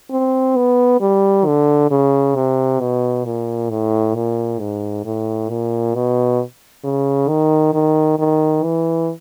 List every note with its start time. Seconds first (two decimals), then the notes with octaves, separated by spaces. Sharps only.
0.11 C4
0.56 B3
1.01 G3
1.46 D3
1.91 C#3
2.36 C3
2.81 B2
3.25 A#2
3.70 A2
4.15 A#2
4.60 G#2
5.05 A2
5.50 A#2
5.95 B2
6.84 C#3
7.29 D#3
7.74 D#3
8.19 D#3
8.64 E3